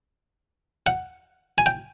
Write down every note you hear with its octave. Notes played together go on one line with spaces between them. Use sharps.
F#5
G#5
G5